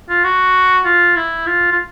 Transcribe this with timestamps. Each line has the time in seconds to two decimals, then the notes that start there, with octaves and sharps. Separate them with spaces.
0.09 F4
0.24 F#4
0.85 F4
1.16 E4
1.46 F4
1.72 F4